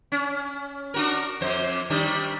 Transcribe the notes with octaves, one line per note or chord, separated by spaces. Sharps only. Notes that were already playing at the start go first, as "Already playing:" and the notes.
C#4
D4 F#4 A#4
F2 C5
D#3 G3 D4